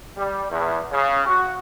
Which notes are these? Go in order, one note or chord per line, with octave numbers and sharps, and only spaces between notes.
G3
E2
C#3
F#4